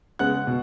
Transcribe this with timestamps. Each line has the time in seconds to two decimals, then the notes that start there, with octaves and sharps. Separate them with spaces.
0.19 C#3 G#3 B3 F#5 F#6
0.47 B2